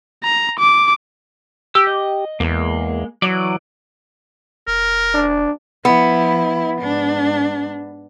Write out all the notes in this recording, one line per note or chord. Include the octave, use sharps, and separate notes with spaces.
A#5
D6
G4 E6
D#5
E2 G#3 A#3
E3 F#3 D5
F1 A#4
D4
F3 B3 E4
G#2 D4